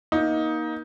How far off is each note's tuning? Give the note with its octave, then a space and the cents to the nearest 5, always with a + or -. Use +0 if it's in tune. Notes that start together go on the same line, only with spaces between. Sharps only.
A#3 +25 D#4 +15